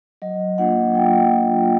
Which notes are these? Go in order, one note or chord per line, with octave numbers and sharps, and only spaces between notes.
F#3 D#5
A#3 D4 F4 F#5
F#3 G5
F#5
A#3 D4 F4 G5